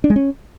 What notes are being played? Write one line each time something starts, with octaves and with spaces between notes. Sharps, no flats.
D4
G#3
C#4